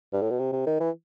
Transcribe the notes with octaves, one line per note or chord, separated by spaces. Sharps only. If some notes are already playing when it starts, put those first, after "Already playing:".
G2
A2
B2
C3
C3
D#3
E3